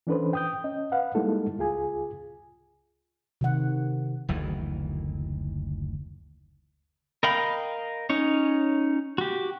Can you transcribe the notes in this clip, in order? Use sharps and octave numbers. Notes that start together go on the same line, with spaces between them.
E3 C#4 D4 A4 B4 C5
G5 D#6 G6
C#4 D#5
B4 F5 F#5
G3 G#3 A#3 D#4 E4 A4
C#2 F4 G#4 G#5
C3 D#3 F#5
F#1 D2 D#3 E3
A#4 D#5 F5 G5 B5
C#4 D#4 C#5
F#4 G4